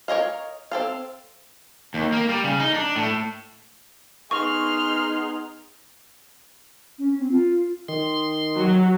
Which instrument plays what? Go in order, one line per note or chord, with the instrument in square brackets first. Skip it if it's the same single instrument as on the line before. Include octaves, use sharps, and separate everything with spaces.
[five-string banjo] A#4 C#5 D#5 F5
C4 A4 F5
[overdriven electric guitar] D#2
A#3
G3
C#3
D#4
D4
A2
[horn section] B3 D#4 G#4 [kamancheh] C6 F6 [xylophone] C#6
[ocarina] C#4
C4
F4
[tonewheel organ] D#3 C6
[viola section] F#3